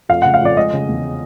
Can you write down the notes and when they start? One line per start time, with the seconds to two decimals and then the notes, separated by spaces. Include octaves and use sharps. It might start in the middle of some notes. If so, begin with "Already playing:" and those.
0.09 F2 F5
0.22 C#3 F#5
0.34 F5
0.42 F2 D5
0.57 G#3 D#5
0.73 C#3
0.89 E2